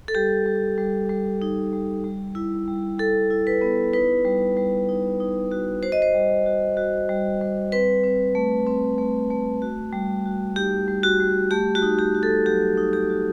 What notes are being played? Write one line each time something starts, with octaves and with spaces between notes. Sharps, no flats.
A4
G3 G4
G3
G3
G3
D#4
G3
G3
E4
G3
G3 A4
E4
B4
B3
D#4 B4
G3
G3
D#4
D#4
F#4
F#4 C5
D#5
C5
G3
F#4
F#4
G3
G3
C4 B4
C4
A3
C4
A3
A3
F#4
G3
F#4
D#4 G4
G3
F#4
G3
A3 G4
F#4
D#4
G4
F#4
A4
F#3 G4
D#4
G4
F#4